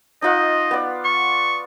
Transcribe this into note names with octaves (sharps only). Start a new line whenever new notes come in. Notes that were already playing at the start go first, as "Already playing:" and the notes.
D#4 F4 D#5 F#5
B3 D5
C#6